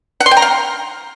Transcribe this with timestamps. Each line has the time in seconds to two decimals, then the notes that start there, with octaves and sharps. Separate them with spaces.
0.20 F#5
0.26 C6
0.31 G5
0.37 A#5
0.42 F5